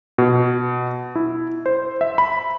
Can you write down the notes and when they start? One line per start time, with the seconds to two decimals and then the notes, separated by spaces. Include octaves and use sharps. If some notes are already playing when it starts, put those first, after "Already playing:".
0.18 B2
1.15 E4
1.66 C5
2.01 E5
2.18 B5